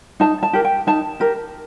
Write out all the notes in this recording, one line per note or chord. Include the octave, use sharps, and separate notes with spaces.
D#4 A5
A5
G4 A#4
G5
D#4 A5
G4 A#4